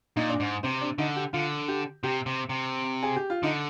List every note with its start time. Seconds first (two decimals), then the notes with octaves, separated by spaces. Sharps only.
0.16 A#2 D#4
0.29 D4
0.40 G#2
0.63 C3 C4
0.81 D4
0.98 D3 D#4
1.16 G4
1.33 D3 F4
1.68 G4
2.03 C3 G4
2.26 C3
2.49 C3
3.03 G#4
3.16 G4
3.30 F4
3.43 D3 D#4